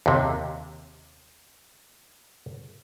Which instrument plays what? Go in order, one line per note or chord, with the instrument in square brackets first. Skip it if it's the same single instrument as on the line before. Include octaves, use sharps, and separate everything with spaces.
[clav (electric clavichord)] D#2 C3